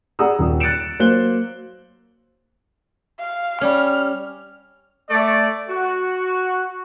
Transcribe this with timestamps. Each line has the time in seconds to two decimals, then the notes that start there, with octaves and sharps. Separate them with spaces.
0.19 G#4 D5 F#5 A#5 D#6 E6
0.39 D#1
0.60 F#6 A6 C#7 D7 E7
0.99 F#3 A#3 C5 F#6 G7
3.19 F5
3.61 G3 C#4 F6
5.10 A3 D5
5.69 F#4